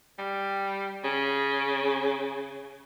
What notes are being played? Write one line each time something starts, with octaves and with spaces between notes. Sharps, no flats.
G3
C#3